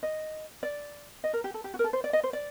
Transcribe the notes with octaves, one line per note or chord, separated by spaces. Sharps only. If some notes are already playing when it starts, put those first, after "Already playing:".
D#5
D5
D#5
A#4
G4
A4
G4
F#4
A#4
A4
C5
D5
D#5
C5
D5